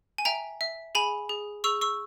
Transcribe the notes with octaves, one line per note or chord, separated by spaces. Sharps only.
G#5
E5 G5 A#5
E5
G#4 G#5 B5
G#4
G#4 C#6 E6
C#6 E6